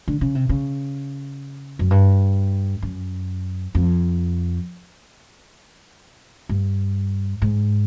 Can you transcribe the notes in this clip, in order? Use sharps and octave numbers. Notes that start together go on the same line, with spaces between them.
D3
C#3
C3
C#3
F#2
G2
F#2
F2
G2
G#2